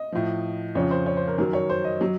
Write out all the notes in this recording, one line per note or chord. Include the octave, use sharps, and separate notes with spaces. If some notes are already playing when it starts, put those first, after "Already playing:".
Already playing: D#5
A2 F3
F2 C#3 F3 C#5
C5
C#5
C5
A#4
F#2 D#3 F#3 A#4
C#5
C5
D#5
F#3